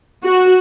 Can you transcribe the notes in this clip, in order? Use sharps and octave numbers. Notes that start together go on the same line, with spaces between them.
F#4